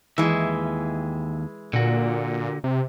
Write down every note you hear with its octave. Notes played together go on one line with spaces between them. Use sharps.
D#2 E3 G#3 E5
A#2 D3 F#4
C3